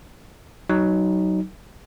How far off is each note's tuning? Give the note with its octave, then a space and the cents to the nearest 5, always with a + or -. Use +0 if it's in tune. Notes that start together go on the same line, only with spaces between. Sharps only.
F#3 +20 D#4 +0